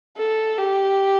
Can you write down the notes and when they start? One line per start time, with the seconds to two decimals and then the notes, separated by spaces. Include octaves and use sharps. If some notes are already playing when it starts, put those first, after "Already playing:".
0.18 A4
0.58 G4